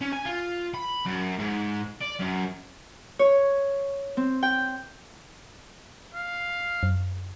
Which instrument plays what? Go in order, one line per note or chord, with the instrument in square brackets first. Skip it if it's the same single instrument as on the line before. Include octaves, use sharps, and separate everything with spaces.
[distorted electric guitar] C#4
G#5
F4
B5
F#2
G#2
D5
F#2
[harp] C#5
C4
G5
[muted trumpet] F5
[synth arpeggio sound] F#2